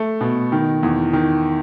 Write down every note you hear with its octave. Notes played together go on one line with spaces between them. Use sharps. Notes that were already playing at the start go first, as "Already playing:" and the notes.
Already playing: A3
B2
D#3
E2
D#3